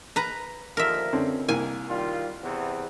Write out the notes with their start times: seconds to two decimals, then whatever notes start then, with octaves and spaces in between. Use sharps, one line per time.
0.16 B4 A#5
0.77 D#2 D3 F3 A#4 E5
1.13 C#2 D3 C4 C#4
1.48 C2 A#3 G#5
1.89 D#3 G3 F4
2.43 E2 C3 B3